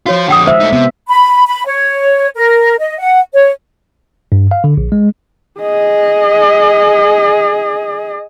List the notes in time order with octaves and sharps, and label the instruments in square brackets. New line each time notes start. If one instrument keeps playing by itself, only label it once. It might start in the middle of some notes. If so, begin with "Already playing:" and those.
[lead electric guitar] F3 F4 [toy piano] F#4 C#5
[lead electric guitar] F2 D3 [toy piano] F#5 G5 D#6
[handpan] G#3 E5 [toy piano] C5
[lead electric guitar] A3 D#4
[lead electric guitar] C3 [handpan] B3
[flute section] B5
B5
C#5
A#4
D#5
F#5
C#5
[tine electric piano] G2
F5
D3
A#1
G#3
[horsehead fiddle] G#4 D#5